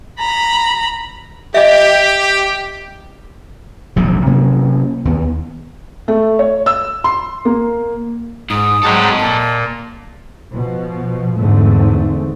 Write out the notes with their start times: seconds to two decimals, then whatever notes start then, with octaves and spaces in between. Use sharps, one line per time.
0.19 A#5 B5
1.54 G4 D#5 E5
3.96 D#1 A#1 C3 F#3
4.26 C3 F#3 A#3 C#4
5.05 D#2 B3
6.08 A3
6.39 C#5
6.66 E6
7.04 C6
7.45 A#3
8.50 G#2 D#6
8.83 G#2 F#3 G3 A4 D#5
9.20 A#2 A5
10.53 B2 F3
11.35 E2 G#2 D3 A3 C4